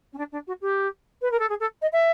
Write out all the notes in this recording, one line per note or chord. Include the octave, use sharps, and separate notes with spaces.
C#4
D4
D4
F#4
G4
B4
A#4
A4
G#4
A4
D#5
E5